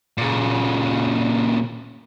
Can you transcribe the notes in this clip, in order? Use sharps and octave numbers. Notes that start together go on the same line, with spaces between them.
A#2 C#3